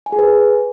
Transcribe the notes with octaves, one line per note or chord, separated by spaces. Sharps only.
G#5
G#4
B4